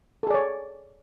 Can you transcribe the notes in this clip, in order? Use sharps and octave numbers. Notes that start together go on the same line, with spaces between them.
G#4 A4 C#5 D5